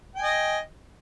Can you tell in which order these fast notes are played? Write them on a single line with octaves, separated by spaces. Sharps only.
G5 G#5 D#5